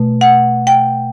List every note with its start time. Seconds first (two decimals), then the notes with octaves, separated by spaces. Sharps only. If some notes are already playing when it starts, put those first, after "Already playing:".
Already playing: B2 A3
0.21 F#5
0.67 G5